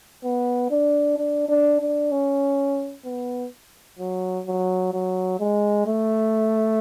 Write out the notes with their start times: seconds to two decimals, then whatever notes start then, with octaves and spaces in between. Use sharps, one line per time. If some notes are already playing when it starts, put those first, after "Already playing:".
0.24 B3
0.71 D4
1.18 D4
1.49 D4
1.80 D4
2.12 C#4
3.05 B3
3.99 F#3
4.47 F#3
4.93 F#3
5.40 G#3
5.86 A3